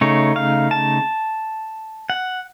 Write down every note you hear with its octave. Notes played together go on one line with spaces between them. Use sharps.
C#3 A3 D#4 C#5
F5
A5
F#5